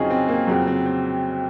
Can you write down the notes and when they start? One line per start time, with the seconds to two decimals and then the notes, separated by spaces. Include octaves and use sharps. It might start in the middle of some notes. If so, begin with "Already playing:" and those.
Already playing: F2 C#3 F#3 C4 C#4 D#4 F4 G#4
0.10 C4
0.28 A#3
0.47 F2 C#3 F#3 C4
0.67 C4
0.86 C4